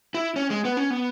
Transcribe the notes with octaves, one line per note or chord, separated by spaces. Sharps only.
E4
C#4
G#3
B3
C#4
B3